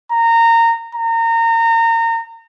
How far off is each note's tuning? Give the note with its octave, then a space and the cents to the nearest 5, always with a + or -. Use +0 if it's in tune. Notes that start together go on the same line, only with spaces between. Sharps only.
A#5 -20
A#5 -30